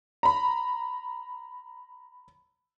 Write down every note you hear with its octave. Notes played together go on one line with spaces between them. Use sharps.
A#5 B5